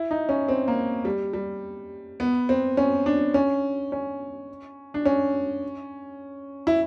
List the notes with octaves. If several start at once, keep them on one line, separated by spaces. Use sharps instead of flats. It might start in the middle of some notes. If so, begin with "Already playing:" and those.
Already playing: E4
D#4
C#4
C4
A#3
G3
G3
B3
C4
C#4
D4
C#4
C#4
D4
C#4
E4